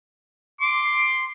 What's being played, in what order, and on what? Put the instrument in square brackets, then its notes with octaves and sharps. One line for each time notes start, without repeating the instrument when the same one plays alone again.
[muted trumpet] C6 [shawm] D6